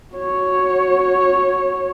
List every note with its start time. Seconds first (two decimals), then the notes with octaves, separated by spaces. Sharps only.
0.14 F#4 C#5